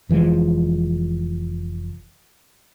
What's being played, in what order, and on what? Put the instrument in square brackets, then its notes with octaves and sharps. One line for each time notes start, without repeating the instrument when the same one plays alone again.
[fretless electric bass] F1 E3 F3 G#3